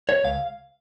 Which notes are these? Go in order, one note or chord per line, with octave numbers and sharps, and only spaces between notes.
C#5
C#2 F5